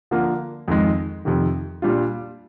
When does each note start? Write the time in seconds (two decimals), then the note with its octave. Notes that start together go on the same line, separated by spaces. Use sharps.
0.11 D3 F3 A#3
0.68 F2 D#3 G#3
1.25 F2 C3 D#3
1.82 A#2 G3 D4 F4